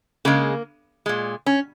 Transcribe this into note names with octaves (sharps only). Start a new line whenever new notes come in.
C#3 G#3 A#3
A#2 G#3
C#4